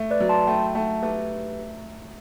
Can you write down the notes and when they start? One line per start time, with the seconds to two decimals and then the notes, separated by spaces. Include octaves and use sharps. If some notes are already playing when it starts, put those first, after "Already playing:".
Already playing: A3
0.11 B4 D5
0.20 F#3
0.29 A5 C6
0.47 A3 G5 B5
0.75 A3 F#5 A5
1.03 A3 G4 B4